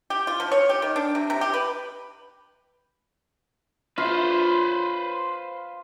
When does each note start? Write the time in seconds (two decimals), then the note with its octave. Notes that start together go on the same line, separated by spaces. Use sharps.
0.10 G4
0.27 F4
0.40 F3
0.52 C#5
0.69 G4
0.82 D#3
0.96 D4
1.15 C3
1.30 C3
1.41 G4
1.53 B4
3.98 F4 B4 C5